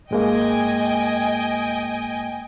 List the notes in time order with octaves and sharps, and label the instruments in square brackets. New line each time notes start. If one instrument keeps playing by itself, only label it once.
[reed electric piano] G#2 G#3 A#3 [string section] D#5 G5 G#5